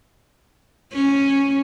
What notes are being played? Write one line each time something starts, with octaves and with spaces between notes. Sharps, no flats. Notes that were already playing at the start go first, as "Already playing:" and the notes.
C#4